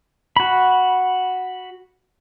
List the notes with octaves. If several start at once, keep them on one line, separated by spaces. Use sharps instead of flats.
F#4 B5